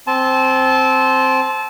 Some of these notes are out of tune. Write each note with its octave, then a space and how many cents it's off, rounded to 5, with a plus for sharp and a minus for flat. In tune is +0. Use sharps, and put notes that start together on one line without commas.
C4 +0 A5 -25 C6 +0